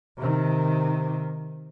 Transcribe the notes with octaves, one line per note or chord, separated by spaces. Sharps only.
C3 D#3